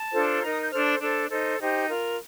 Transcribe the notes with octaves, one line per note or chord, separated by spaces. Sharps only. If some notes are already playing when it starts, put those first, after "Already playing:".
Already playing: A5
D4 F4 A4 C5
D#4 A#4 A#5
D#6
G6
D4 A4 C5 F6
D4 A4 C5 A5
D#4 A4 C5
D#4 G4 C5
F4 A#4